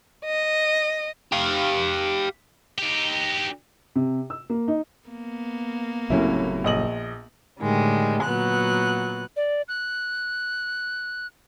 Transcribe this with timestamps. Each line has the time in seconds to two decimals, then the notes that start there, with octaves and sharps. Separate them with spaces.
0.25 D#5
1.32 G4 F5
2.78 D#4 G4
3.95 C3
4.30 E6
4.50 A#3
4.68 D#4
5.08 A#3 B3
6.10 F#1 C2 F#2 A2 C#4 E4
6.64 A#1 D#5 F#7
7.61 A2 D3 D#3 G3 G#3
8.24 A#2 F#3 B3 F#6
9.37 D5
9.68 F#6